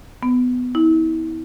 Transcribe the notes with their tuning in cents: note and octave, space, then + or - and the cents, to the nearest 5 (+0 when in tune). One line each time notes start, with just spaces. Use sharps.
B3 +15
E4 -40